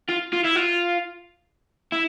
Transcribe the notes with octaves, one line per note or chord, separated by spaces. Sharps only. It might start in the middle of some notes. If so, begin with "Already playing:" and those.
F4
F4
E4
F4
E4